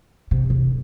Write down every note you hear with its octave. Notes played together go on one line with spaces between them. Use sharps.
C3
D3